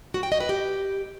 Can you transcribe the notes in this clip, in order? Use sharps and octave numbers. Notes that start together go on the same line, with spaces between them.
F#4
G5
D#5
B4
G4